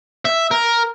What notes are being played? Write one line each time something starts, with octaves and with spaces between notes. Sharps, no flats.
E5
A#4